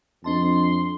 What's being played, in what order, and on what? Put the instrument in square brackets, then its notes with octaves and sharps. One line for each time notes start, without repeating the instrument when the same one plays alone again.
[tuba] F2 [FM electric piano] D4 D#5 A5 [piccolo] C6